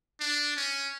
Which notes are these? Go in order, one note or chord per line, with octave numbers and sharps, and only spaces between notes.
D4
C#4